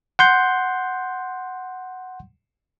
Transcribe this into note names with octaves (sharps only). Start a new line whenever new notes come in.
F#5 C6 G6